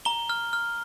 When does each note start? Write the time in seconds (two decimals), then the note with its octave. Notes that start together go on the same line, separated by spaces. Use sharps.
0.05 A#5 G7
0.29 F6
0.53 F6